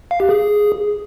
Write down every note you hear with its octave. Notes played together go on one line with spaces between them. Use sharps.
F5
G4
G#4